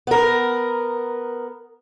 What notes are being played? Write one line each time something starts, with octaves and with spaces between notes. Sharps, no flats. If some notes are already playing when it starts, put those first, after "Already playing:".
B3 A#4